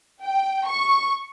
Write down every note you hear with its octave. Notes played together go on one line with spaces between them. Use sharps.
G5
C#6